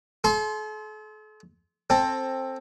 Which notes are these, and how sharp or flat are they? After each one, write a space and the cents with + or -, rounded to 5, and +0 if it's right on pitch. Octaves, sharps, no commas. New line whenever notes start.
A4 -45 C6 +0
C4 +15 A4 +0